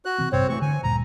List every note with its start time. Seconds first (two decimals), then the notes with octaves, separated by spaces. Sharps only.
0.05 F#4 F#6
0.18 C3 E3 C4
0.32 A1 G2 C3 C4 C5 C#5
0.50 E3 A3 C#6
0.62 D3 G#5
0.83 D2 G2 A#2 A#5